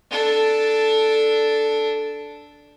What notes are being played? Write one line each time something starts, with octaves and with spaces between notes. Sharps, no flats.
D4 A4